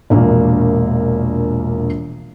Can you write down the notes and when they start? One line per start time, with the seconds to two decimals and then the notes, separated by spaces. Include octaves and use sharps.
0.10 E1 A#1 A#3